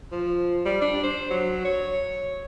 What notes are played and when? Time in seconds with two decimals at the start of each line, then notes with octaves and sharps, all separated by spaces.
0.11 F3
0.65 G3
0.82 D4
1.03 C5
1.31 F#3
1.65 C#5